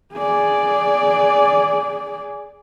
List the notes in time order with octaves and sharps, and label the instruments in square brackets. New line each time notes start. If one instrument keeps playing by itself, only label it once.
[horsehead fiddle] G#4 D5